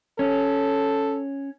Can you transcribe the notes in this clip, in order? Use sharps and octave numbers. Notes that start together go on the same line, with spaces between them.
C#4 A4